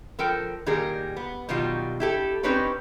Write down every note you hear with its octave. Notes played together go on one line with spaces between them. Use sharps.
F3 A4 A#4 G5
A#2 D#3 G3 G#4 A#4
B3
B2 D#3 F#3 G3 F4
E4 G4 A4
C4 C#4 D#4 B4 C#5 D5